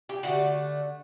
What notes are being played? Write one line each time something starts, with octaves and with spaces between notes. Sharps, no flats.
G4
D3 A3 F#4